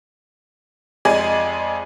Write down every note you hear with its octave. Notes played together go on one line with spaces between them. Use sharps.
F2 G#3 D5 G#5